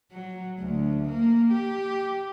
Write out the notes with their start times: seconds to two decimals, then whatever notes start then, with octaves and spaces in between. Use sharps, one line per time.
0.12 F#3
0.60 D2
1.09 A#3
1.52 G4